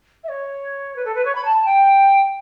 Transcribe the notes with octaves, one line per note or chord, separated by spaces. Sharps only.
E5
C#5
B4
A4
B4
C#5
B5
A5
G5